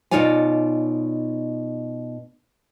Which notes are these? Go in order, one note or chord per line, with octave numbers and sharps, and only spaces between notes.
B2 D#4 F4 C#5 D5 G#5